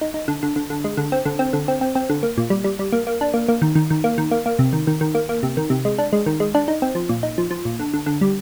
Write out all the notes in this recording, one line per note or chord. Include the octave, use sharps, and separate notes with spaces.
D#4
D#4
D3
D3
D3
D3
G#3
D3
C4
D3
C4
D3
C4
C4
C4
D3
A#3
A#2
G3
G3
G3
A#3
A#3
D4
A#3
A#3
D#3
D#3
D#3
A#3
D#3
A#3
A#3
C3
D#3
D#3
D#3
A#3
A#3
C3
D#3
C3
G#3
D4
G#3
D#3
G#3
D4
D#4
C4
F3
A#2
D#4
F3
F3
A#2
D3
D3
D3
G3